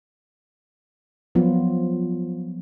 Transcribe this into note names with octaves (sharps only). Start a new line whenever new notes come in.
F3 F#3 B3 F4